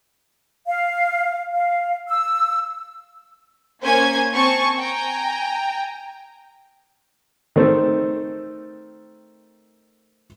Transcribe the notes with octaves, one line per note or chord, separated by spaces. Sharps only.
F5
F5
E6
A#3 C#4 C5 G#5 G#6
C4 G#5 A5 C#6
G5 G#5 A#5
D#3 A3 C4 A4